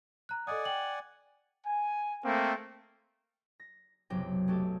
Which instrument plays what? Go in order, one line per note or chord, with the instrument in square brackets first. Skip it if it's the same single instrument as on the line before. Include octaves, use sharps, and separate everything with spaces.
[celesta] A#5 F#6
[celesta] A4 D#5 D#6 [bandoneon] D5 F#5 G#5
[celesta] G5 F#7
[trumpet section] G#5
A3 A#3 C4
[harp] A#6
F#1 B1 C3 F#3 G5 A#6
G#3 A3 C#4 F#4 G4 A4